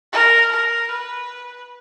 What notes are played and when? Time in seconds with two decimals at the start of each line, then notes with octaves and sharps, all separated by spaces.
0.13 A#4
0.51 A#4
0.91 B4